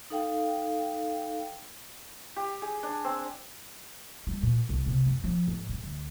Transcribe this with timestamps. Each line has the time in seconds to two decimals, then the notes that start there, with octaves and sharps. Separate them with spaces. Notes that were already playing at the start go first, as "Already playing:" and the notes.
0.10 D#4 A4 F5 G5
2.36 G4
2.62 G#4
2.83 D4
3.04 C4
4.27 G3
4.43 A#2
4.69 C2
4.86 C3
5.06 F#2
5.24 F3
5.47 G#2
5.69 G#2
5.84 D2